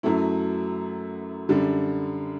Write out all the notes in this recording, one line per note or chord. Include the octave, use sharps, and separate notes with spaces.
F#2 F#3 A3 E4
F#2 D3 G3